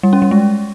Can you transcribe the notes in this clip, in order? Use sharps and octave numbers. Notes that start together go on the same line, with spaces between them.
G3
C#4
G3
G#3